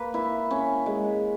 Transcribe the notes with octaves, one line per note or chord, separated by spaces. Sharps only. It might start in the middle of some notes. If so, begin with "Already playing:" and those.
Already playing: A#3 B4
E4
C#4
G#3